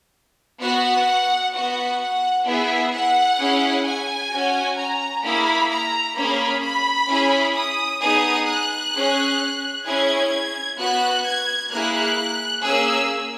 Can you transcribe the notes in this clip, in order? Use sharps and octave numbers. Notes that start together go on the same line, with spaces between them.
B3 F#4 F#5
B3 F#4 F#5
F#5
B3 E4 G#4 E5
F#5
C#4 E4 G#4
G#5
C#4 F#4
A#5
A#3 E4 G#4 B5
A#5
A#3 C#4 G#4 B5
B5
C#4 E4 G#4
D#6
B3 D#4 G#4 D#6
F#6
C#4 G#4
C#4 E4 G#4 G#6
B3 F#4 F#6
G#6
A#3 E4 G#4 F#6
A#3 C#4 G#4 E6